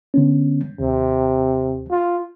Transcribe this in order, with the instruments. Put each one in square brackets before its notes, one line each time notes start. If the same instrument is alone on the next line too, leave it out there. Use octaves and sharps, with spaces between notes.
[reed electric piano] D3 B3 C#4
[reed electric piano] D#2 [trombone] C3
[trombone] F4